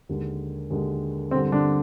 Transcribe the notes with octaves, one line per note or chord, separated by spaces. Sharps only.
D#2 D3 G#3
D#2 D3 G#3
G2 D3 G3 C4
D3 D4